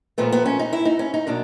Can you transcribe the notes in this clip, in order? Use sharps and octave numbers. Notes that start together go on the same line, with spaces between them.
A#2 F3 A3 B3
B3
C#4
D#4
E4
D#4
C#4
D#4
B2 F#3 A#3 D4